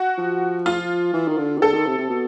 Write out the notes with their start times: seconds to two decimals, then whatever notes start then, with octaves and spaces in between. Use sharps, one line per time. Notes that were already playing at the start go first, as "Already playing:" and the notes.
Already playing: F#4
0.18 F3
0.66 F4
1.14 E3
1.28 D#3
1.38 D3
1.58 D#3
1.62 D3 A4
1.74 D#3
1.86 C3
1.98 C3
2.10 B2